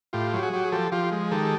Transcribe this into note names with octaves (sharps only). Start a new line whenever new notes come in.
A2 F4 G4
F#3 G4
F#4 G#4
F#3 G4
G#4
F3 G4 A4
F3 F4 G4
G#3
D#3 G4 A4